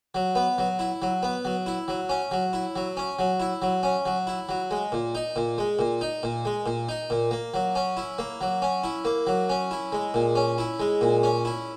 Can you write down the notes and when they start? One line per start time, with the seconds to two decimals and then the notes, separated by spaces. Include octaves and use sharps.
0.15 F#3
0.35 B3
0.58 F#3
0.79 E4
1.02 F#3
1.23 B3
1.45 F#3
1.66 E4
1.88 F#3
2.09 C#4
2.31 F#3
2.53 E4
2.76 F#3
2.97 C#4
3.19 F#3
3.40 E4
3.62 F#3
3.83 C#4
4.06 F#3
4.27 E4
4.49 F#3
4.71 G#3
4.92 A#2
5.15 D#4
5.36 A#2
5.58 G#3
5.79 A#2
6.01 D#4
6.23 A#2
6.45 G#3
6.66 A#2
6.89 D#4
7.10 A#2
7.31 A#3
7.54 F#3
7.75 C#4
7.97 E4
8.19 A#3
8.41 F#3
8.62 C#4
8.84 E4
9.05 A#3
9.27 F#3
9.49 C#4
9.71 E4
9.92 G#3
10.14 A#2
10.35 C#4
10.58 E4
10.80 G#3
11.01 A#2
11.23 C#4
11.45 E4